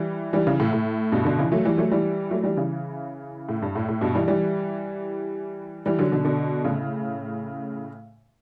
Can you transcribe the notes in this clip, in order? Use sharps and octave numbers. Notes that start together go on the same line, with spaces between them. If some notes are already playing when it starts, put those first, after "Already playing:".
Already playing: E3 G3
E3 G3
C#3 E3
A2
A2
G2 B2
B2 D3
C#3 E3
F#3 A3
E3 G3
F#3 A3
E3 G3
F#3 A3
E3 G3
C#3 E3
A2
G2
A2
A2
G2 B2
E3 G3
E3 G3
E3 G3
D3 F#3
B2 D3
B2 D3
A2 C#3